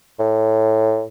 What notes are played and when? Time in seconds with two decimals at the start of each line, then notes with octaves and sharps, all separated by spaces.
0.19 A2